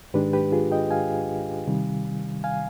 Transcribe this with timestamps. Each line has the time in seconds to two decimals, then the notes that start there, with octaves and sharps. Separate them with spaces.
0.14 G#2 D#3 G#3 D4 G4 B4
0.33 G4 B4
0.52 F4 G#4
0.72 D#5 G5
0.91 F5 G#5
1.67 C3 D#3 G3
2.44 F5 G#5